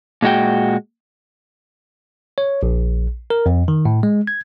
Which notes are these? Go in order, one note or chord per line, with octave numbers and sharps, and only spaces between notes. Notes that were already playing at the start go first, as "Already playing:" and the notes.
A#2 G#3 F#4 G5
C#5
A#1
A#4
F2
D#3
A2
G#3
G#6